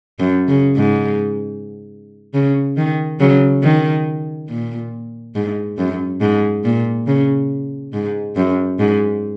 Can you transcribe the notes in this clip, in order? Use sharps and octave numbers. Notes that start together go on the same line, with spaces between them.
F#2
C#3
G#2
C#3
D#3
C#3 F#3
D#3
A#2
G#2
F#2
G#2
A#2
C#3
G#2
F#2
G#2